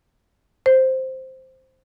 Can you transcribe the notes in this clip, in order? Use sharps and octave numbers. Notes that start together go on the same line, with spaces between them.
C5